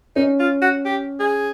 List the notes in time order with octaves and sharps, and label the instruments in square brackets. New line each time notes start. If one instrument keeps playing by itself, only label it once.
[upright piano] C#4 [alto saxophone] D#4
[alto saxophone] F4
F#4
G4
G#4